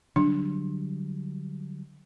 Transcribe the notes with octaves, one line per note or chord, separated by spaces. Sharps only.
D3 F#3 G3 D4